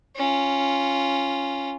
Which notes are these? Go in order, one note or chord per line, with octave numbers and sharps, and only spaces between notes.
C#4 F4